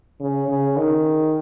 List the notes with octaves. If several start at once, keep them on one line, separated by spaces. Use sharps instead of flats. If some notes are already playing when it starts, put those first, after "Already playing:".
C#3
C#3
D#3